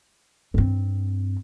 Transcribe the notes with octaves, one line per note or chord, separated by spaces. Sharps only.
G2 C4